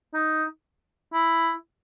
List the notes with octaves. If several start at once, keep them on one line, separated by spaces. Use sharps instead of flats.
D#4
E4